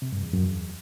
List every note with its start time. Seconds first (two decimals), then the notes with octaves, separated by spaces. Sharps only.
0.02 C3
0.12 G2
0.23 E2
0.33 F#2
0.44 E2